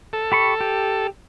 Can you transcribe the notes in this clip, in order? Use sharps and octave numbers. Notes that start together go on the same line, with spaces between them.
A4
G4 B5 C#6
G4